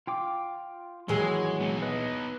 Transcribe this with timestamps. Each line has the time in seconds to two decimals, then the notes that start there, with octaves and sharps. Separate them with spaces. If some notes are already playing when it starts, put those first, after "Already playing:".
0.07 F4 G5 D6
1.08 D#2 E3 F#3 G#3 G#4
1.60 B3 D#4
1.82 B4 D#5